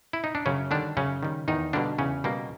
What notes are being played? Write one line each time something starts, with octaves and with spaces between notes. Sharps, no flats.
E4
D#4
D4
F#2 C#3 C#4
D3 D#3 G3 D4
F#2 C#3 C#4
D#3 G3
E2 D#3 D#4
B2 D3 G3 A#3 D4
E2 C#3 C#4
B2 G3 A#3